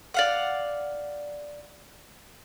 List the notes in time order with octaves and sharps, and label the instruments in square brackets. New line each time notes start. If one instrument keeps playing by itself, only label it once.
[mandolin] D5 F5 F#5